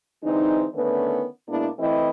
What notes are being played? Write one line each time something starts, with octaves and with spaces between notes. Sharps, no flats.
D3 E3 G#3 C4 D#4
D3 D#3 A3 B3 C#4 B4
B2 G#3 A#3 B3 D4 E4
E3 A3 C4 E4 B4 D#5